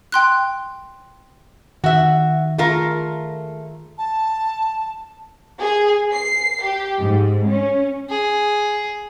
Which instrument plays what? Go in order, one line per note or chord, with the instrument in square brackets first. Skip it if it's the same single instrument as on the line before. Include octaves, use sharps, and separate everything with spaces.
[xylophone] G5 C6 F#6
[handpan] D#3 [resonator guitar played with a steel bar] F#4 E5
[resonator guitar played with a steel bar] A3 F4 A#4 [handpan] G#4
[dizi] A5
[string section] G#4
C7
G4
G#2
C#4
[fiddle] G#4